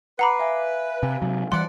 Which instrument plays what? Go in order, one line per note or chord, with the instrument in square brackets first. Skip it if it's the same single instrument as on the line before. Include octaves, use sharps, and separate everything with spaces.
[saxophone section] B4 [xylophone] F#5 A#5 B5 [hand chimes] D6 C7
[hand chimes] E5 F5 G#5
[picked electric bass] C3 [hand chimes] F5 G#5
[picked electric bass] C3 F#3
[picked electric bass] E3 G3 [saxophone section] D5 F#5 [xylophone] C6